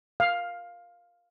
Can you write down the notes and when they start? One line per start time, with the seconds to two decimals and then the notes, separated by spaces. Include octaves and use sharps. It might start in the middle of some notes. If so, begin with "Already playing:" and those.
0.20 F5